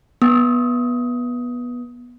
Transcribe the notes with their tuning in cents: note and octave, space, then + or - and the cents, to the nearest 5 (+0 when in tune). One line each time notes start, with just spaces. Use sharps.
B3 -15 D#6 +20